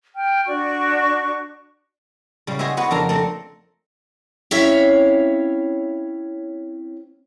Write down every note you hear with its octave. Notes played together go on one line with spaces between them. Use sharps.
G5 F6
D4 F#4 D5 C#6
C#3 G3
F#4 G#4 C5 D#5 E5
B3 F#4 B4 F#5
F2 C#3 D4 A#4 A#5
A3 C4 A#4
C4 C#4 E4 C#5 E5 F5